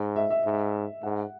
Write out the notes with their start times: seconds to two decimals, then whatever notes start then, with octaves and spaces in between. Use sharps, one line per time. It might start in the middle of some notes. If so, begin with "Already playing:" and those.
Already playing: G#2 D#5
0.16 E5
0.30 E5
0.45 G#2
1.03 G#2 F#5